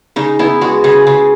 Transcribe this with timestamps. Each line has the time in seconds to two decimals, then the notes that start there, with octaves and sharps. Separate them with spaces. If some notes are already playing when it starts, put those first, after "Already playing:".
0.16 C#3 D#4
0.39 B3 E4
0.61 G#3 F#4
0.84 C#3 G#4
1.07 C#3